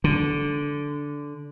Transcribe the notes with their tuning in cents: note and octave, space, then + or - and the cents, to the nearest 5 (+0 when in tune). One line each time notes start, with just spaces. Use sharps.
D3 -10